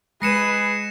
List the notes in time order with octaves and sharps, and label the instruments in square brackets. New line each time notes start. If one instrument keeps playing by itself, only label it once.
[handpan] G#3 [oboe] G#4 [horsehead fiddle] B4 [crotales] A#6 C#7 E7